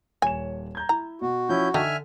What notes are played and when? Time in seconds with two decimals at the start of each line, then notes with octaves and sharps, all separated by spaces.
0.22 D#1 C#5 G#5 E7
0.75 A#5 G6 G#6
0.89 E4 A#5
1.22 B2 F#4
1.49 F3 C#4 E4 G6
1.74 D3 D4 D#4 E5 G5 G#5 F6